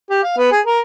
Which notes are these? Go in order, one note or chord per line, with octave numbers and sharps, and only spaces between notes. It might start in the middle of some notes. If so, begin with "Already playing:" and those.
G4
F5
B3
G#4
A#4